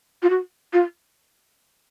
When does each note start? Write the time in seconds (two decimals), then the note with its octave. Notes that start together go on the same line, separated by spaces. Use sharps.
0.23 F4
0.30 F#4
0.73 F4